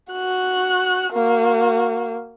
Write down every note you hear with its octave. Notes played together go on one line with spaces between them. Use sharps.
F#4 F#6
A#3 F#4